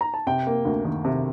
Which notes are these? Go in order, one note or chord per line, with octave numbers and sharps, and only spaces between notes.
A#5
A5
C3 G5
A#3
D2
D#3
C3